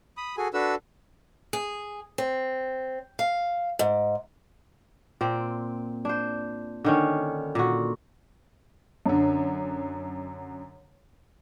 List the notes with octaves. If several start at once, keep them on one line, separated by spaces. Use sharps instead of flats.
B5 D#6
F#4 G#4 A4 G#5
D4 F#4 A4 B4 E6
G#4
C4
F5
G#2
A#2 C4
D4 C5
D3 D#3 C#4
A#2 F#4
F#2 D3